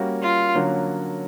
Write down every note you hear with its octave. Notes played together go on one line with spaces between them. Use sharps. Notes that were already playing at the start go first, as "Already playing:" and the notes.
Already playing: G3 A#3 C#4 F#4
F4
D3 F#3 A#3 C#4